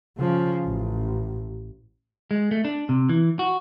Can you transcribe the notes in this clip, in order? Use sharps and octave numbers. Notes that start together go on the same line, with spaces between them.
C#3 F3
A1
G#3
A3
D4
C3
E3
F#4